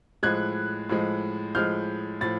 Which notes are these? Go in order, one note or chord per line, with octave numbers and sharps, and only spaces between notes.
A2 F3 G#3 F#6 G#6
A2 F3 G#3
A2 F3 G#3 F6 G6
A2 F3 A6